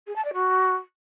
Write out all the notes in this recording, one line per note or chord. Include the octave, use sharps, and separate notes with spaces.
G#4
A5
D5
F#4